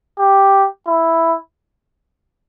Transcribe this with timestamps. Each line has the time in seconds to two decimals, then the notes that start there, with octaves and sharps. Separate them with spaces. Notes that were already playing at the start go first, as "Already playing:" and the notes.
0.19 G4
0.87 E4